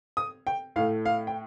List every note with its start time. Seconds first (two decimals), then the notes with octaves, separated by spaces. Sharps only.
0.17 D#6
0.47 G5
0.76 A2 F5
0.80 A3
1.06 F5
1.27 G5